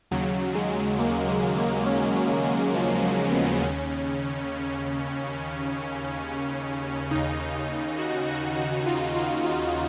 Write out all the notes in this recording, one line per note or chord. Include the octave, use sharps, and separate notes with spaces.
D#2 C#3 F#3
G#3
A#3
G#3
A#3
C#4
F#3
F#3
F3
F#3
B3
D#2 C#3 C#4
D#2 C#3 D#4
F#4
F#4
F#4
F4
F4
F4